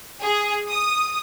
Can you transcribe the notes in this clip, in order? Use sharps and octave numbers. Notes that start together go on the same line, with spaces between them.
G#4
D#6